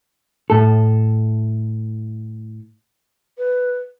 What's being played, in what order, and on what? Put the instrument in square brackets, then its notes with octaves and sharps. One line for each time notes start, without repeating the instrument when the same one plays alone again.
[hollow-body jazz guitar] A2 A4
[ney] B4